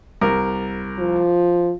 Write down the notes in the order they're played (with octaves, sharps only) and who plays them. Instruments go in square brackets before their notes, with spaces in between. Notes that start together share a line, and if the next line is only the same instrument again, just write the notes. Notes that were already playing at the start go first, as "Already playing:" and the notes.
[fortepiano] C2 A#4
[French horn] F3